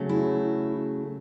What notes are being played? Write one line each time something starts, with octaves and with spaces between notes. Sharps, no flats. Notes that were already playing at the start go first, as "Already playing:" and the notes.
Already playing: C#3 F#3 A3
E4